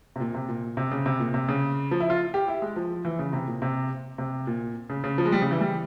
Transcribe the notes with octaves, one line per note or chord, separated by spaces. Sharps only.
C3
A#2
C3
A#2
C3
C#3
C3
A#2
C3
C#3
F3
E4
F4
G4
E4
G#3
F3
E3
C#3
C3
A#2
C3
C3
A#2
C#3
C#3
F3
G#3
G3
C#3
E3
G3